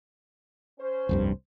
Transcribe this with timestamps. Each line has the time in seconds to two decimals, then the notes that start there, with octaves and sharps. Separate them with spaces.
0.79 C#4 C5
1.09 F1 C2 G2